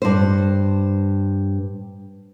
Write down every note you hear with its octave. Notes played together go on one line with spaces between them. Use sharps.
G2 C5